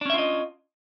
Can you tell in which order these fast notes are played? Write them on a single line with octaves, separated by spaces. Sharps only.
D4 C#4 E5 F4 D#5